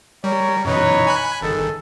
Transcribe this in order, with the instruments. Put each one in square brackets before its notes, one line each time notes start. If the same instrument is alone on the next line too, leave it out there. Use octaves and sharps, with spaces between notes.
[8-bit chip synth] G3 [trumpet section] A#4 C#5
[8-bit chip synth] F#2 B2 E3 [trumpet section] D#4 B4 C#5
[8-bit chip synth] G#5 B5 F#6
[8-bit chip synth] G1 D#3 [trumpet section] G#4 A4